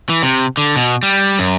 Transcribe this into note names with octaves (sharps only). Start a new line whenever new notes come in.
E3
C3
D3
B2
G3
F#2